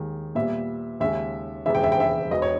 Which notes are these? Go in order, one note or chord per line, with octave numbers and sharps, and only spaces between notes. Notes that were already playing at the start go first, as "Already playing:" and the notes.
Already playing: D#2 D#3 G#3
A#2 G3 B3 E5
D#2 C#3 G#3 E5
E1 D#2 C#3 E3 G#3 E5
G5
E5
G5
E5
E1 E2 B2 D#5
C#5